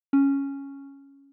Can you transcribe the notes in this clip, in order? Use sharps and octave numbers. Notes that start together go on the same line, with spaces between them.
C#4